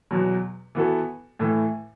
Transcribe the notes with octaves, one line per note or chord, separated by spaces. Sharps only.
E2 B2 F#3
E3 B3 F#4 A4
A2 E3 A3